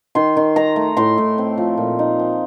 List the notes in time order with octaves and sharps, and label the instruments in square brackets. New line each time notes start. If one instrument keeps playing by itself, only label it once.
[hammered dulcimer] D#3 C6
D#3
D#4 A#5
A3
A2 C6
A2
C4
F3
A#2
D#4
C4